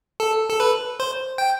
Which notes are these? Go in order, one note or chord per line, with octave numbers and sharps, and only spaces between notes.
A4
A4
B4
C5
G5